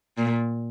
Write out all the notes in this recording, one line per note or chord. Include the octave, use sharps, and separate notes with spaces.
A#2